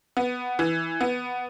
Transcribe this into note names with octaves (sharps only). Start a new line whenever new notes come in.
B3
E3
B3